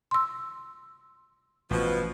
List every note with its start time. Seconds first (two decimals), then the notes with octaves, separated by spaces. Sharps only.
0.11 C6 E6
1.71 A1 B2 F3